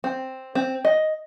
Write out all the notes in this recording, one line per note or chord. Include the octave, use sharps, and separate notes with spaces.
C4
C4
D#5